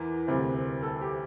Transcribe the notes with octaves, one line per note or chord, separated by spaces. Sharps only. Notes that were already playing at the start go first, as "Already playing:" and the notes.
Already playing: E2 E3 A#4
D2 C3 G3 C5
A4
G4